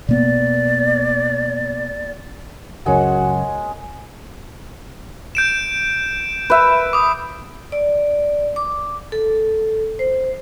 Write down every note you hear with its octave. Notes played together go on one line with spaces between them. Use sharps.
B2 A#3 B3 D5
C#2 F#2 C#3 G#3 F#4 A#4 C#5
G6 D7 E7
B4 E5
D6 D#6
D5
D6
A4
C5